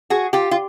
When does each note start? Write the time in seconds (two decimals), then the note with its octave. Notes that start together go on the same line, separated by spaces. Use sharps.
0.10 F#4 G#4
0.33 F4 G4
0.51 F4